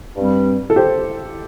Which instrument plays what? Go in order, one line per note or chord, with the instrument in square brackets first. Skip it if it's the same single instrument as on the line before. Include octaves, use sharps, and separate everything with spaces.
[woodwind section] G2 G3 C4
[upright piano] A4
G4 C5